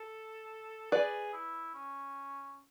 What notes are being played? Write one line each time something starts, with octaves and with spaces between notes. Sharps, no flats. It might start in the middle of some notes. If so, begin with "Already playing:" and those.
Already playing: A4
G#4 B4 D5
E4
C#4